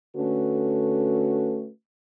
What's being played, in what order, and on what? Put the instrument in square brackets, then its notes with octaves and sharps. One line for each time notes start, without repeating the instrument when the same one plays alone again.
[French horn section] D3 A3 C#4 F#4 A4 B4